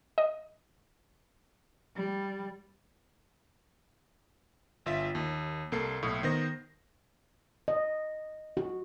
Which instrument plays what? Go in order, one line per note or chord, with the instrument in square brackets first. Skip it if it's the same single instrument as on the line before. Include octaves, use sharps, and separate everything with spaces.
[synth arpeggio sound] D#5
[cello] G3
[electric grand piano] G1 F4 E5 B6
D#2
C2 A#3 A4 C7
B1 A2
D#3 B3 C5 A#6
[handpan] D#5
F#4